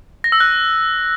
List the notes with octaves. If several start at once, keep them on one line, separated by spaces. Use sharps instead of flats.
A#6
E6
F#6